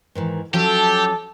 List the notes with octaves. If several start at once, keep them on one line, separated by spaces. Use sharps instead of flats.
G#2 D#3 E3
F3 F#3 C#4 G4 A4 A5